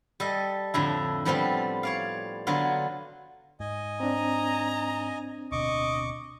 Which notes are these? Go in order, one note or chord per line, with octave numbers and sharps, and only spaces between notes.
G3 A4 D#5
F2 A2 D3 E4
A2 F3 G3 B3 C4 F4
C#5 D5 F5
D3 F#3 B3 F4
G#2 D#5 G#5
C4 D4 A#5
D1 B2 D3 D#5 C#6 D6